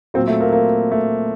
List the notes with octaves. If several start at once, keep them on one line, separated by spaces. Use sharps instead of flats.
A#2 F#3 C4
A3
A#3
A#3
A3